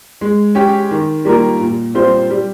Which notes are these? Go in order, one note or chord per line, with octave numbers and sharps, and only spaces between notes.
G#3
C#4 G4
D#3
G3 A#3 F4 A#4
A#2
G3 C4 F4 C5
G3